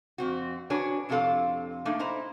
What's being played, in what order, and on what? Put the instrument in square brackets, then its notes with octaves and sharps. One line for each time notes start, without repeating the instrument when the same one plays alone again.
[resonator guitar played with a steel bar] F2 C4 F#4
D4 F#4 G#4 B4 C#5
F2 C3 D4 F4 A4 F5
A3 A#3 D4 D#4
D#4 E4 C5 A#5